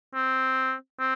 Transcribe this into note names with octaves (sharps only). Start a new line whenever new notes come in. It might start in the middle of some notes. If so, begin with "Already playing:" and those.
C4
C4